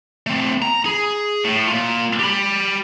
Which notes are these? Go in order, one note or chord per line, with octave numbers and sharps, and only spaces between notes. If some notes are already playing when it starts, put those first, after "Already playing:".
A3 C4
A#5
G#4
A2
A#3 F4
G4 B5